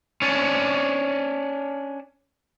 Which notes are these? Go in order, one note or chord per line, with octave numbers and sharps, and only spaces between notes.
C#4 D4